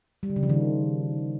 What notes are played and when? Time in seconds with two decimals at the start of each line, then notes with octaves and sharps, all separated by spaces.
0.23 G3
0.30 D3
0.36 C#3
0.43 F3
0.50 D#3